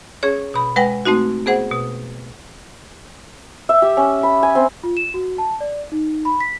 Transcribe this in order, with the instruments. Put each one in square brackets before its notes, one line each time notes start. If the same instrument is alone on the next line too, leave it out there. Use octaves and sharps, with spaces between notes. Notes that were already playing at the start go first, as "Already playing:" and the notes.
[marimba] C#4 G#4 C#5
B2 B5
G#3 B4 F#5 G5 A#6
A3 C4 D#4 F#4
B3 G#4 C5 F#5
B2
[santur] E5
G4
C#4
B5
G#5
C4
[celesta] F4
E7
F#4
A5
D5
D#4
B5
B6